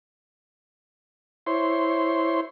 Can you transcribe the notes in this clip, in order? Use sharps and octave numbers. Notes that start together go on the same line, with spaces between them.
E4 C5 C#5 C6